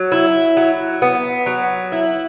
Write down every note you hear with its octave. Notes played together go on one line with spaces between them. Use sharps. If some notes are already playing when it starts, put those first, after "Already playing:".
Already playing: F#3
E4
F#3
B3
F#3
E4